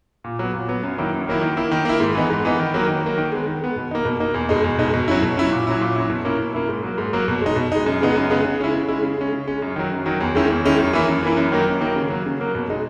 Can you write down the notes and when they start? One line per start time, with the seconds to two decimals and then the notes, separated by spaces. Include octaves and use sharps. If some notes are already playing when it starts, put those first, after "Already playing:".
0.24 A#2
0.39 F#3 B3
0.54 A#2
0.68 F#3 B3
0.83 F#2
0.98 D#3 F#3 A#3 E4
1.13 F#2
1.27 D#3 F#3 A#3 E4
1.41 D#3
1.57 A#3 E4
1.71 D#3
1.85 A#3 E4
2.00 G#2
2.15 E3 B3 D#4
2.30 G#2
2.45 E3 B3 D#4
2.59 D#3
2.74 F#3 A#3
2.88 D#3
3.03 F#3 A#3
3.18 D#3
3.32 G#3 B3
3.46 D#3
3.61 G#3 B3
3.76 B2
3.91 A#3 D#4
4.05 B2
4.20 A#3 D#4
4.34 E2
4.49 B2 G#3 D#4
4.64 E2
4.79 B2 G#3 D#4
4.94 B2
5.08 F#3 C#4 E4
5.22 B2
5.37 F#3 C#4 E4
5.52 A#2
5.67 F#3 C#4 E4
5.81 A#2
5.96 F#3 C#4 E4
6.10 B2
6.25 A#3 C#4 E4
6.40 B2
6.54 A#3 C#4 E4
6.68 G#2
6.83 F#3 A#3
6.98 G#2
7.13 F#3 A#3
7.28 B2
7.41 G#3 D#4
7.56 B2
7.72 G#3 D#4
7.86 F#2
8.01 C#3 G#3 B3 D#4
8.16 F#2
8.30 C#3 G#3 B3 D#4
8.44 C#3
8.59 G#3 C#4 E4
8.74 C#3
8.88 G#3 C#4 E4
9.03 C#3
9.18 G#3 C#4
9.33 C#3
9.47 G#3 C#4
9.62 F#2
9.76 D#3 F#3
9.92 F#2
10.06 D#3 F#3
10.20 E2
10.35 D#3 G#3 C#4 E4
10.50 E2
10.65 D#3 G#3 C#4 E4
10.79 F#2
10.93 E3 A#3 E4
11.08 F#2
11.23 E3 A#3 E4
11.37 F#2
11.52 D#3 F#3 A#3
11.67 F#2
11.81 D#3 F#3 A#3
11.96 C#3
12.10 F#3 A#3
12.26 C#3
12.40 F#3 A#3
12.55 B2
12.70 G#3 D#4